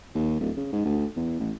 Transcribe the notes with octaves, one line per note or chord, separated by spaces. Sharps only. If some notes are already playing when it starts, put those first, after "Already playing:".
D#2
D1
C#3
G#2
D2
E2
A1